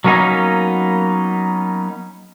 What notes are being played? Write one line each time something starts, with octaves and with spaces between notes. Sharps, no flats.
F#3 A#3 B3 C#4 D#4